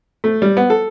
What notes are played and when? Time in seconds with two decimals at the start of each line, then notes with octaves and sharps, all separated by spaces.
0.24 A3
0.42 G3
0.57 B3
0.70 A4